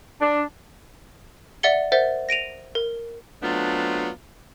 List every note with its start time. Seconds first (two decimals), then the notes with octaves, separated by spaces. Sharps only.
0.22 D4
1.63 D5 E5 F#5 A6 C#7 G7
1.92 A#4 C5 E5 F#5 A6
2.29 A#6 D7 D#7 F7
2.75 A#4
3.43 F#3 A3 B3 C4 D4 F4